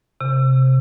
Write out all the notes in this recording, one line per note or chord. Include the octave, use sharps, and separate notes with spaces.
C3